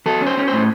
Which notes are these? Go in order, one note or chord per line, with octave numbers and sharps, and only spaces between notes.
F#3 A4
C#4
C5
C#4
A2 C5